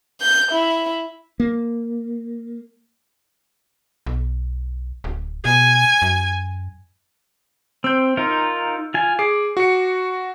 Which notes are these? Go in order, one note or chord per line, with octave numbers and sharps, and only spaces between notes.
G6
E4
A#3
B1
D1
B2 G#5
F#2
C4 E6 G6
D#4 F4 A#4
F4 G#5
G#4 D6 C7
F#4 C#7